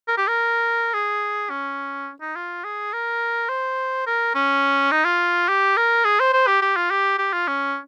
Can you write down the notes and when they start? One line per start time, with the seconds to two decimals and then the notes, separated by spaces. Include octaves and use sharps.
0.08 A#4
0.18 G4
0.28 A#4
0.94 G#4
1.50 C#4
2.21 D#4
2.36 F4
2.64 G#4
2.93 A#4
3.49 C5
4.07 A#4
4.35 C#4
4.91 D#4
5.05 F4
5.48 G4
5.77 A#4
6.04 G#4
6.20 C5
6.33 C5
6.47 G4
6.62 G4
6.76 F4
6.91 G4
7.18 G4
7.33 F4
7.48 C#4